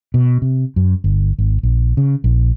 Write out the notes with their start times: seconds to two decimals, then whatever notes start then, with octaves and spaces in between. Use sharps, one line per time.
0.14 B2
0.42 C3
0.76 F#2
1.04 G1
1.38 G#1
1.63 A#1
1.97 C#3
2.24 A#1